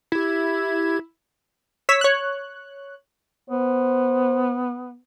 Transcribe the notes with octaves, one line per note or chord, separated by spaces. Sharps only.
E4 G4 G#6
C#5 E6 B6
C#5 F#6
B3 C5